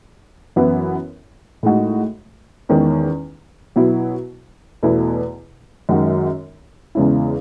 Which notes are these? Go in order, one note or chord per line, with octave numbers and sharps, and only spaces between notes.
F#2 E3 B3 E4
A2 G#3 D#4 F#4
E2 D#3 G#3 C#4
B2 F#3 B3 E4
E2 B2 A3 E4
F#2 D#3 G#3 D#4 F#4
E2 C#3 G#3 C#4 E4